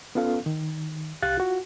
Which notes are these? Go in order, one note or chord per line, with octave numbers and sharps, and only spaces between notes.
B3 C#4 F4 A4 F5
D#3
C2 G4 F5 F#6 A6
F4 F#4